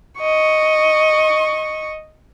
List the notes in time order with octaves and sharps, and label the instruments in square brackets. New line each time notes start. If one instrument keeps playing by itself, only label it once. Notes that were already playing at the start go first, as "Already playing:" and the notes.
[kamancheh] D#5 C#6